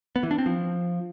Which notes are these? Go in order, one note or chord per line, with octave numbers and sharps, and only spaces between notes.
B3
E3
D4
C4
F3